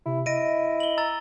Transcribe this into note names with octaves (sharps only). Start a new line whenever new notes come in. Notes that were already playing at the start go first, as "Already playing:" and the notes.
C3 E4
E4 D#5 A#6 D7 D#7
F#7 G7
A#5 E6 A6